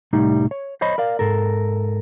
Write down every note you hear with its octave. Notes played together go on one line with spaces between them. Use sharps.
C2 A2 G3 D#4
C#5
C5 C#5 D#5 B5
A#4 D5 F5
G#2 A4 A#4